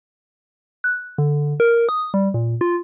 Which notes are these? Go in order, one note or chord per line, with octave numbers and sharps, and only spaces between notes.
F#6
D3
A#4
D#6
G3
A#2
F4